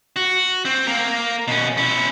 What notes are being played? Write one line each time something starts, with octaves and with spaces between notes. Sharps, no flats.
F#4
C4
A#3 A#4
B2 C#4
C#4 E4